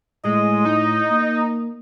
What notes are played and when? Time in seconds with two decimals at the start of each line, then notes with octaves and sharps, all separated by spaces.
0.24 A2 G#3 D#5
0.65 D#4
1.10 A#3